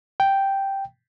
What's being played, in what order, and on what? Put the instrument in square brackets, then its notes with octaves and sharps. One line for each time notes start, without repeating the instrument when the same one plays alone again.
[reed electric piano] G5